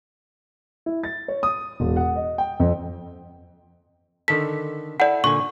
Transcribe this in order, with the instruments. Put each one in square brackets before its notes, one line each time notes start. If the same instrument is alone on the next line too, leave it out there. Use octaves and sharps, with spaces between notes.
[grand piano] E4
A6
C#5
D#6
E1
F#5
D#5
G5
F2
[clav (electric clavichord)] D3 D#3 A4 [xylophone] B6
[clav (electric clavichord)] E4 A4 [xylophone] D5 F#5
[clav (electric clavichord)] A#2 D3 G#5 [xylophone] C#6